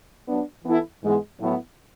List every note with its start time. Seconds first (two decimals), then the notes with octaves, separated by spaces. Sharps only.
0.27 F#3 B3 D4
0.65 E3 B3 E4 A4
1.02 G#2 E3 G#3 B3
1.40 A2 F#3 B3 E4